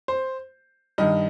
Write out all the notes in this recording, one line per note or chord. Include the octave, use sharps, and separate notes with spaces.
C5
G2 D#3 D#5